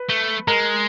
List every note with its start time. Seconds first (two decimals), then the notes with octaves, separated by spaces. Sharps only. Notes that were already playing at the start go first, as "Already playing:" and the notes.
Already playing: B4
0.09 A3
0.47 G#3 A#4